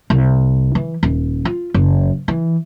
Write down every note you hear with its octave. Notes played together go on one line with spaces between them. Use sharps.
C2
E3
D#1
F4
F#1
E3